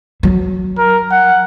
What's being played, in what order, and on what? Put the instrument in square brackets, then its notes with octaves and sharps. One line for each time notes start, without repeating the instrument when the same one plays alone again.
[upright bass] F#3
[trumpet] A#4
F#5